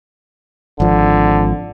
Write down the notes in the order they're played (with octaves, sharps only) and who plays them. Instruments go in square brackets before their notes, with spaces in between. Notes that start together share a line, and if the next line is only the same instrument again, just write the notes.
[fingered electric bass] G#1 F3 [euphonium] D3